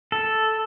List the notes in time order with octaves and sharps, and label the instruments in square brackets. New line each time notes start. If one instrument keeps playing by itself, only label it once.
[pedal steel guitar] A4